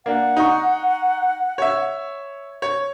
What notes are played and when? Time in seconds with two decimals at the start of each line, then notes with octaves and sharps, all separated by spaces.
0.06 A#3 D4 F#5
0.37 D#4 C#6
1.58 C#5 E5
2.62 C#5